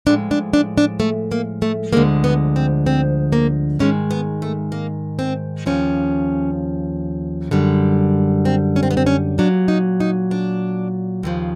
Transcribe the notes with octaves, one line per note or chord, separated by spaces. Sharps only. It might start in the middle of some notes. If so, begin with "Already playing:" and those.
A2 F3 G#3 D4
D4
D4
D4
A3
A#3
A3
D2 D3 F3 G#3 A#3
B3
C4
C4
A#3
G#2 D#3 G#3 C#4
B3
A3
A#3
C4
D#2 C#3 F3 C#4
F#2 D3 G3
C4
C#4
C4
B3
C4
C#4
A#2 F#3 D4
D#4
D#4
D4
D#2 C#3 F3